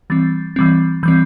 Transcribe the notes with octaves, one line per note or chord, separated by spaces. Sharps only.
E3 G3 C4 A6
E3 G3 C4
E3 G3 C4 G6